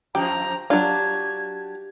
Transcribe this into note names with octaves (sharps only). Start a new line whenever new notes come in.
F2 F3 G4 A#5
F#3 D4 F4 G4 G#6